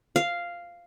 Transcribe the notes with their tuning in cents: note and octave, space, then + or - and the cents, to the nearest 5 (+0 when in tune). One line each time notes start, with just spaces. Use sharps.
F5 -5